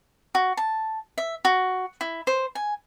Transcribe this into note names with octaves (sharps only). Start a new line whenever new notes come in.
F#4
A5
E5
F#4
E4
C5
G#5